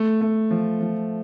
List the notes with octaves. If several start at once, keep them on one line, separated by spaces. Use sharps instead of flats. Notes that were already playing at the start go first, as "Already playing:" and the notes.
Already playing: A3
A3
F3
F3